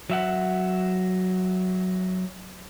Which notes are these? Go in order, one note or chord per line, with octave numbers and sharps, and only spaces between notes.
F#3 E5 F#5